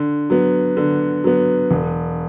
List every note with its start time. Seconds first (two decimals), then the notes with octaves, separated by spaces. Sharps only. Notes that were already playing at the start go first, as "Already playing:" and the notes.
Already playing: D3
0.30 F#3 B3
0.77 D3
1.24 F#3 B3
1.71 E1